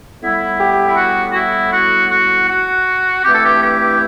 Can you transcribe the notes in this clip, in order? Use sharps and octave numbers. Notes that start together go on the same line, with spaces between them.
A2 G3 B3 E4
G4
E4
F#4
F#4
E4
F#4
F#4
F#4
G2 E3 A3 C4 E4 G4
A4
G4
G4